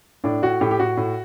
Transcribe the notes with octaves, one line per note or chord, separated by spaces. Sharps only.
A2 D4
A2 F#4
A2 G4
G4
A2 F#4
A2